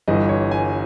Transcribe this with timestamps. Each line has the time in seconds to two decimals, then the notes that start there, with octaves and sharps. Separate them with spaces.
0.08 G1 G2 E3 D#5
0.29 C#5
0.51 G#5